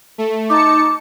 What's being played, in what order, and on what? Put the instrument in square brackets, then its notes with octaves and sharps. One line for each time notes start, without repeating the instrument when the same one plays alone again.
[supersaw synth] A3
[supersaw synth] D#4 A5 C#7 [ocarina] D6